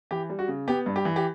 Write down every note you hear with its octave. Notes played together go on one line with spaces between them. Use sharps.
E3 G4
G3
F#4
C#3
B3 G4
G2
G4
E3
G4